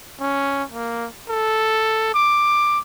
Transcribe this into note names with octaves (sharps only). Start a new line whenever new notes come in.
C#4
A#3
A4
D6